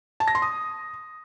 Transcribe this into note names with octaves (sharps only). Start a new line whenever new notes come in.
A5
A#6
C6
D#6